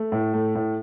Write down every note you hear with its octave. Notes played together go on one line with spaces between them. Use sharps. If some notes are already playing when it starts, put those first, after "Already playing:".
Already playing: A3
A2
A3
A2